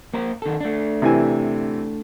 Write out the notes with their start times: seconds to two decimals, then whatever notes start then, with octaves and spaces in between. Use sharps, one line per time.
0.14 A#3 A#4 C5
0.42 D#3 A4
0.61 A3 D4
1.02 C3 E3 G#5